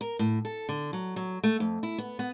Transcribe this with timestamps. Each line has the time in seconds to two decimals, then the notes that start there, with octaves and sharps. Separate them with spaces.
0.01 A#4
0.19 A2
0.45 A4
0.69 D3
0.93 F#3
1.16 F#3
1.44 A3
1.60 F2
1.83 E4
1.98 B3
2.19 B3